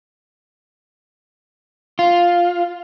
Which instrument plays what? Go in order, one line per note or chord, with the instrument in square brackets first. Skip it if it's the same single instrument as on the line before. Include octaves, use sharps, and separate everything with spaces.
[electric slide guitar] F4